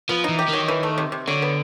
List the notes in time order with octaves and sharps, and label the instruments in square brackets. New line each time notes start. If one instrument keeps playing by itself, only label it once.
[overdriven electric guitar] F3 [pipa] B3
[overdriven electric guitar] E3 [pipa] D#4
[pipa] G4
[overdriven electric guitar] D#3 [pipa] F#3
[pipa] E3
A3
C3
C3
[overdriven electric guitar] D3 [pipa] F#3
[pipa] B3